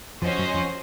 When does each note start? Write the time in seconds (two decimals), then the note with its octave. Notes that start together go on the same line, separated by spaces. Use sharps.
0.22 F2 F3 C#4 F#4 C5 D#5
0.38 F#2 F#3
0.54 F2 F3